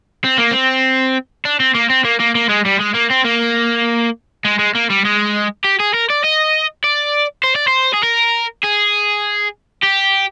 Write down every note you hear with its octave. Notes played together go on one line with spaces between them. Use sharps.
C4
A#3
C4
D4
C4
A#3
C4
A#3
A#3
A#3
G#3
G3
G#3
A#3
C4
A#3
G#3
G#3
A#3
G3
G#3
G4
G#4
A#4
D5
D#5
D5
C5
D5
C5
G#4
A#4
G#4
G4